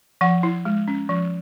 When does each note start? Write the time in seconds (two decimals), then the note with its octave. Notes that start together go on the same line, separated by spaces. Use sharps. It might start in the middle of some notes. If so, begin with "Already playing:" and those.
0.21 F3 F#5
0.43 E4
0.65 G#3
0.88 C#4
1.09 F3